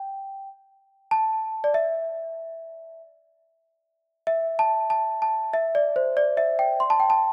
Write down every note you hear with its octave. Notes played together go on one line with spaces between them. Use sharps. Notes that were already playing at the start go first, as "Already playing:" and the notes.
Already playing: G5
A5
D5
E5
E5
A5
A5
A5
E5
D5
C5
D5
E5
G5
C6
A5
G5
A5